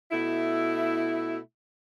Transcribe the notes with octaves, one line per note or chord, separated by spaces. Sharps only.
B2 A3 E4